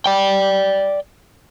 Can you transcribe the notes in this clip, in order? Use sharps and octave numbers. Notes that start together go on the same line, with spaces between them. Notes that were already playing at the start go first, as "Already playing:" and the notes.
D5 G5